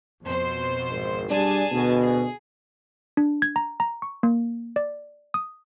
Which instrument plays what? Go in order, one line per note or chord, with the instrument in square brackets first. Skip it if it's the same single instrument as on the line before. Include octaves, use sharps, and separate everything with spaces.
[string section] F2 B2 C5
[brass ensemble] G#1
[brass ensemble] G3 D4 D5 [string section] G#4 G#5 A5
[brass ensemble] D2 B2
[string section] G#4
[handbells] D4
G#6
A#5
A#5
C#6
A#3
D5
D#6